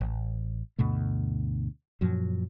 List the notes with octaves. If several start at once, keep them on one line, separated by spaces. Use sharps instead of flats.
A1
D2 G2 B2 A3
F#2 A#2 F3 F#3